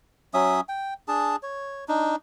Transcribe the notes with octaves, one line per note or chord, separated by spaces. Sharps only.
F#3 C#4 E5 D#6
G5
D4 G#4 A5
C#5
D4 D#4